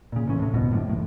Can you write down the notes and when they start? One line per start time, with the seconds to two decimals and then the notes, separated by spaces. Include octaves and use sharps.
0.12 A#2 C#3
0.28 A1 C#4
0.39 A2 C3
0.54 D1 G1 C2 B2
0.71 F#2 A2 D3
0.89 A1 A2